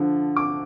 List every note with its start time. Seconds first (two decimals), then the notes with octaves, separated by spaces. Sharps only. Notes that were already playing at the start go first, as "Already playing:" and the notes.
Already playing: D3 F3
0.37 D6